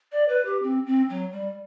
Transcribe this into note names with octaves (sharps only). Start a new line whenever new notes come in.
D5
B4
G4
C4
C4
F#3
G3